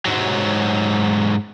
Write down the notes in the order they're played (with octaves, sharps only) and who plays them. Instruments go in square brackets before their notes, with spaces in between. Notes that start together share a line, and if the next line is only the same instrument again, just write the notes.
[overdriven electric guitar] G#2 F#3